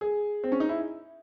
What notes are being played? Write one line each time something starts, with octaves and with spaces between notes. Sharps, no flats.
G#4
C4
C#4
D#4
E4